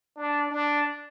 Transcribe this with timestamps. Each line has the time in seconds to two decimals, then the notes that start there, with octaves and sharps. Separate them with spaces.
0.17 D4
0.51 D4